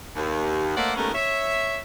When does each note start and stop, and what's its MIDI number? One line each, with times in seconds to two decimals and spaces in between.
0.16 0.76 39
0.77 0.92 57
0.77 0.92 58
0.77 0.92 72
0.77 0.92 74
0.77 0.92 78
0.96 1.11 39
0.96 1.11 44
0.96 1.11 57
0.96 1.11 59
0.96 1.11 61
0.96 1.11 70
1.14 1.79 73
1.14 1.79 76